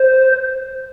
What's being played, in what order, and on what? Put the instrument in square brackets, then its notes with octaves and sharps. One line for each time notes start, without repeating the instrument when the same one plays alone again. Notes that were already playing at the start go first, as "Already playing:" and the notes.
Already playing: [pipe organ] C5